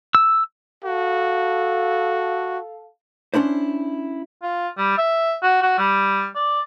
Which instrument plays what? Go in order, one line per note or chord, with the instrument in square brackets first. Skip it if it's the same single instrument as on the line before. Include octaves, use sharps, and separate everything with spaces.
[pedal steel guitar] E6
[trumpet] F#4 [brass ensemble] A4 F5
[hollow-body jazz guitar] C#4 D4 E4 C5
[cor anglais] F4
G3
E5
F#4
F#4
G3
D5